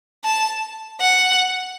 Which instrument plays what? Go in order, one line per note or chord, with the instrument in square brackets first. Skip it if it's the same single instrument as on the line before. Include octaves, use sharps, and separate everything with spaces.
[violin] A5
F#5